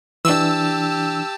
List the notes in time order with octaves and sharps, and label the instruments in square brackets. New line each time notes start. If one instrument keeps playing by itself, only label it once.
[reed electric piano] E3 D4 [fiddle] G4 A5 [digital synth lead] E6